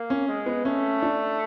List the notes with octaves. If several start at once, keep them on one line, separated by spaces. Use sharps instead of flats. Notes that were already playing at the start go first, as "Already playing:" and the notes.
Already playing: A#3
C#4
G#3
B3
A3 C#4
D4